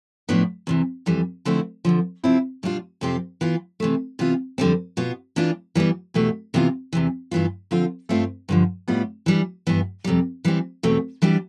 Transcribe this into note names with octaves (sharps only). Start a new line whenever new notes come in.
A2 F3 B3 D4
E2 C3 E3
F2 E3 G3
D3 F3 A3 C4 E4
F2 D3 F3
C3 F3 C4 E4
B2 G3 D4 F4
F2 C3 F3 C4 G4
E3 B3 F4
C3 E3 A3
C3 E3 B3 F4
F2 D3 G3 C4
B2 B3 F4
E3 B3 D4 F4
E3 G3 B3
E2 B2 A3 E4 G4
C3 E3 B3 F4
E2 C3 E3
G2 E3 B3 F4
D3 F3 C4 F4
G2 F3 A3 C4 F4
G2 D3 F3
A2 G3 B3 F4
E3 G3 D4
G2 E3 B3
F2 C3 G3
E3 G3 C4
E2 B2 A3 C4
E3 G3 B3 D4 G4